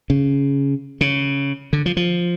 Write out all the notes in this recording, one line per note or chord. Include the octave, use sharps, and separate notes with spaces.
C#3
C#3
D3
F3
F3